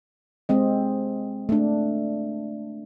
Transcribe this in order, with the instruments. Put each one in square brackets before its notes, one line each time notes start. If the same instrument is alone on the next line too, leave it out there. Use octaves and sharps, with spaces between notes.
[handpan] G#3 C4 D#5
A3 D4